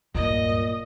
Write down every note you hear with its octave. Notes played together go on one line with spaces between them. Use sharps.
D1 G2 A#2 D#5